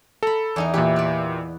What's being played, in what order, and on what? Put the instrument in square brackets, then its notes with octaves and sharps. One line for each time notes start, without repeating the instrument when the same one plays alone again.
[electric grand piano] A4 [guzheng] A#5 B5
[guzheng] E2 D#4 A#4
[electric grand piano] A#2 G4 [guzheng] E3 B4
[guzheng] B4 D5